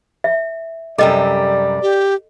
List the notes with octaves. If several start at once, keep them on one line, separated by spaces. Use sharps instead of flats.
E5
F#2 C3 G3 A4 D5 D#5
G4